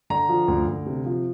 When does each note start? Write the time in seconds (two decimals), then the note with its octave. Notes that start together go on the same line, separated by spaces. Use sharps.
0.10 D3 A#5
0.29 F3
0.48 D2
0.68 D2
0.86 C3
1.06 F3